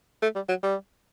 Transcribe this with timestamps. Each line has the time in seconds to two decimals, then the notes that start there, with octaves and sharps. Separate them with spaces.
0.22 A3
0.35 G3
0.49 F#3
0.63 G3